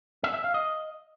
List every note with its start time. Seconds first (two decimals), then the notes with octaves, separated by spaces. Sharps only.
0.24 E5
0.34 E5
0.44 F5
0.54 D#5